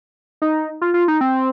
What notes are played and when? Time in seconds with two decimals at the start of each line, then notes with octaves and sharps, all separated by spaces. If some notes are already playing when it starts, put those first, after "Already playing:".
0.42 D#4
0.81 F4
0.94 F4
1.08 D#4
1.21 C4